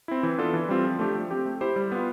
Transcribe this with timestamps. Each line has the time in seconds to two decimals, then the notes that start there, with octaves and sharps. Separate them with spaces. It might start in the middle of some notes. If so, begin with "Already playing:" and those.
0.08 C4 E4
0.23 E3
0.38 B3 D4 F4 A4
0.53 E3
0.69 G3 C4 F4
0.85 F3
0.99 A3 D4 G4
1.15 F3
1.31 C4 G4
1.46 A3
1.61 E4 G4 C5
1.76 G3
1.92 B3 F4